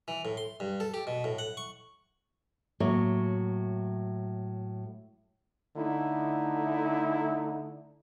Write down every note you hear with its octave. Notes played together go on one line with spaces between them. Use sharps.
E3
A2
C6
G2
A4
G4
B2
A2
F#5
C#6
A2 F#3 A#3
D3 A3 D#4 E4